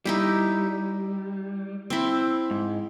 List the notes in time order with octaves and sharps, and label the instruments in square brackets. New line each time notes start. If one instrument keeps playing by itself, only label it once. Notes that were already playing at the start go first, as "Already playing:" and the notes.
[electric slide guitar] G3 [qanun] D#4 E4 G4
[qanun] C4 E4
[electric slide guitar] G#2